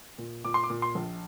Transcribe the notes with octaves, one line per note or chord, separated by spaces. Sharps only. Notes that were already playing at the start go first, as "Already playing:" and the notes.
A#2
A#2 D6
C6
D6
A#2
C6
A#1